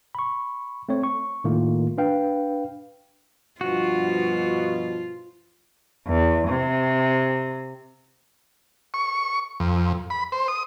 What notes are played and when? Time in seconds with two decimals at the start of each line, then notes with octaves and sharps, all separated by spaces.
0.15 B5 C#6
0.89 A3 C4 C#5
1.03 C#6
1.44 A2 D#3 A3 A#3 F4
1.98 D4 B4 F5 G5
3.61 G2 B2 F3 F4 F#4
6.07 E2
6.48 C3
8.94 C#6
9.60 F2
10.10 B5
10.32 C5
10.48 D#6